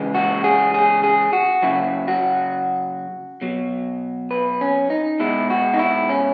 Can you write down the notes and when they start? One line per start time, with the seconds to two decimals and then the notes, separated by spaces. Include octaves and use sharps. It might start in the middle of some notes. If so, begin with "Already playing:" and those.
Already playing: C#3 E3 G#3
0.15 F#4
0.44 G#4
0.74 G#4
1.04 G#4
1.33 F#4
1.62 C#3 F#3 E4
2.08 F#4
3.42 B2 F#3
4.31 B4
4.61 C#4
4.90 D#4
5.20 B2 G#3 E4
5.50 F#4
5.74 D#4
5.79 E4
6.09 C#4